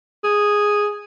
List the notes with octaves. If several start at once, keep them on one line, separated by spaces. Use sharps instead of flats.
G#4